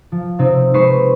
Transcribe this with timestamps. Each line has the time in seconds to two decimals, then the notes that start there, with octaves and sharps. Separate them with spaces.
0.12 F3
0.39 C3 C4 D#4
0.74 G#3 D#4 B4 C5 C#6 C7